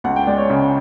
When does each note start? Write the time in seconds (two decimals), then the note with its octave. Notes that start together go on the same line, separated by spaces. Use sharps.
0.04 C#2 F#5
0.16 G5
0.27 G#3 D5
0.38 C#5
0.50 C#3